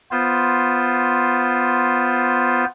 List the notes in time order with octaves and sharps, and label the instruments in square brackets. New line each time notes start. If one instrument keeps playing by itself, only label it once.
[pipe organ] B3 F4 C5